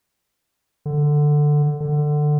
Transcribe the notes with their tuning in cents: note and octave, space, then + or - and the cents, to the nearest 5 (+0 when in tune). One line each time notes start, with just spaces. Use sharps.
D3 +10
D3 +20